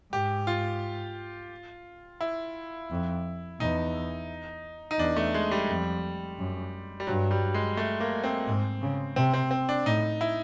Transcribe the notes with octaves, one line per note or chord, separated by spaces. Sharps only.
G#2 G4
F4
E4
F2
E2 D#4
D#4
E2 D4
A3
G#3
G3
F2
F#2
G3
G2 F#3
G3
G#3
A3
A#3
C4
G#2
C#3
C3 C4
C4
C4
D4
A2 D#4
E4